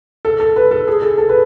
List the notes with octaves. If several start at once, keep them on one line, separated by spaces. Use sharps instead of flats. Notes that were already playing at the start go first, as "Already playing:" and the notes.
A4
A4
B4
A4
G#4
A4
A4
B4